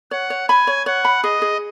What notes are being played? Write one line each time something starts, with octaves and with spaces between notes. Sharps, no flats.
C#5 F#5
C#5
G#5 B5
C#5
C#5 F#5
B5
G#4 D#5
G#4